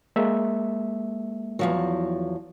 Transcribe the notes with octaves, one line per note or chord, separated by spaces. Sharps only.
G#3 A#3 E5
E2 F3 F#3